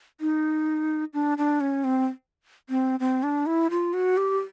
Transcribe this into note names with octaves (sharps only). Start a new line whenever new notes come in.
D#4
D4
D4
C#4
C4
C4
C4
D4
E4
F4
F#4
G4